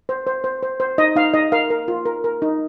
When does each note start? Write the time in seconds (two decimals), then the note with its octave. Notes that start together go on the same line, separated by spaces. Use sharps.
0.09 C5
0.27 C5
0.44 C5
0.63 C5
0.80 C5
0.98 D#4 D#5
1.16 D#4 F5
1.34 D#4 D#5
1.52 A#4 F5
1.70 A#4
1.88 F4
2.06 A#4
2.24 A#4
2.42 D#4